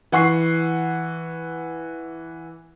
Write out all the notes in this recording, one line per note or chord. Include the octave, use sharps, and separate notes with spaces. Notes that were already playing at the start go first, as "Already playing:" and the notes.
E3 F#5 C#6 C7